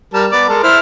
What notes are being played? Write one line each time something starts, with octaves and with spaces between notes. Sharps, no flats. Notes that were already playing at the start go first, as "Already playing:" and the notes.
G3 A#4 A5
B3 D5
G#3 A4 A#4
E4 C5 F6